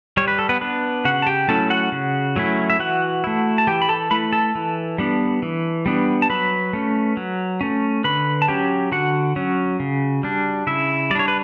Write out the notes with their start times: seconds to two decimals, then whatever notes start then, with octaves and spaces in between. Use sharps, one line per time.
0.17 G3 C#5
0.28 B4
0.39 A4
0.49 B3 B4
0.61 B3 D4 B4
1.05 C#3 F#4 F#5
1.22 A5
1.27 G4 G5
1.48 F#3 A3 C#4 E4 A4 A5
1.70 F#4 F#5
1.92 C#3
2.36 F#3 A3 C#4 E4
2.70 E5
2.79 E3 F#4 F#5
3.24 A3 E4
3.58 A5
3.67 E3 G4 G5
3.82 B5
3.89 A4 A5
4.11 A3 E4 B4 B5
4.33 A4 A5
4.55 E3
4.98 G3 B3 D4
5.42 E3
5.86 G3 B3 D4
6.22 A5
6.29 F#3 B4 B5
6.73 A3 C#4
7.17 F#3
7.61 A3 C#4
8.04 D3 B4 B5
8.42 A5
8.48 F#3 C#4 G4 G5
8.92 D3 F#4 F#5
9.36 F#3 C#4
9.80 C#3
10.23 G3 D4
10.67 C#3 E4 E5
11.10 G3 D5
11.15 D4 C#5
11.28 B4